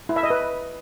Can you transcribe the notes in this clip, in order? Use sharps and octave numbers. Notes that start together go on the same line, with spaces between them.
E4
E5
D#5
B4